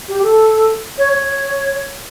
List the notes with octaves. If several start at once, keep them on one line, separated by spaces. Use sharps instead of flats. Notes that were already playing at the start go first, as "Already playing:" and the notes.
G4
A4
C#5
C#5